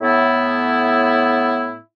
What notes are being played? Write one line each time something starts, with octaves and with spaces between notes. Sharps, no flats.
A2 B3 E4